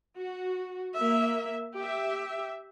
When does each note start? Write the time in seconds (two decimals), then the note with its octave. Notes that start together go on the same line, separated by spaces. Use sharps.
0.18 F#4
0.96 A#3 E5
1.77 G4 E5